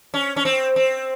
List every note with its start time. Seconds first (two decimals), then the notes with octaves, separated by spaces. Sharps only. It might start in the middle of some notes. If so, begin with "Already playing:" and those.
0.14 C#4
0.36 C#4
0.45 C4
0.76 C4